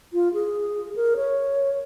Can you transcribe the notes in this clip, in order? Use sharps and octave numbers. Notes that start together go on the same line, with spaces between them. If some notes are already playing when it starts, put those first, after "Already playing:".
F4
G#4
A#4
C#5